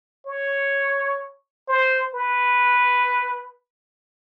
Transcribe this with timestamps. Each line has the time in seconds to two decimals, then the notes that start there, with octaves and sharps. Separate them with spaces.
0.26 C#5
1.68 C5
2.15 B4